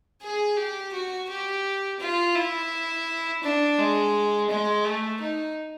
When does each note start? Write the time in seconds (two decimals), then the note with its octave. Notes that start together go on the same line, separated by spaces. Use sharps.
0.22 G#4
0.57 G4
0.93 F#4
1.29 G4
2.00 F4
2.35 E4
3.43 D4
3.78 G#3
4.50 G#3
4.85 A3
5.21 D#4